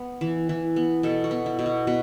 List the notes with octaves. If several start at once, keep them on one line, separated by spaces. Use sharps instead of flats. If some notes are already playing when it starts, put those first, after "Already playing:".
Already playing: B3
E3
E3
B3
B2 A4
F#4
B3
E4
B2
F#4
B2 B4